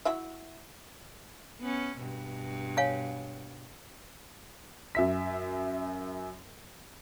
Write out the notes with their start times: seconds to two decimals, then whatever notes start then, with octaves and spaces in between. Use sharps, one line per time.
0.05 E4 F#4 E5
1.61 B3 C#4
1.98 G2 B2
2.77 C#5 F5 G#5
4.95 F#2 E5 B6